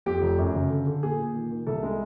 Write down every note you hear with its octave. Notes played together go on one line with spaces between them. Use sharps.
F2 G4
F1
F#2
C#3
D3
D3
A#2 G#4
A#2
D#3
D#3
C2 A4
G#3